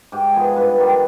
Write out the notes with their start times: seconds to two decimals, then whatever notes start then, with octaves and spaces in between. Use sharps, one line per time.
0.12 G#2 G4
0.34 F3 B3 G#4
0.56 G2 B4
0.78 D#3 G3